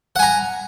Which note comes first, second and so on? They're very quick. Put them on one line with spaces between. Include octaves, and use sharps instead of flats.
F#5 G#5 A#5